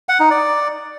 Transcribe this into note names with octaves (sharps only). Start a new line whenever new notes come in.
F#5
D#4
D5